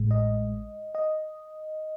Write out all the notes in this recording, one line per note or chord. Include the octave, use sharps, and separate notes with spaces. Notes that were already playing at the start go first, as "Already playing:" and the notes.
Already playing: A1 A2 G#3
D#5
D#5